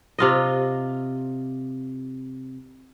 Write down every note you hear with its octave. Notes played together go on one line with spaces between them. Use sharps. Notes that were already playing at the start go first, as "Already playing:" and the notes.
C3 F4 D#5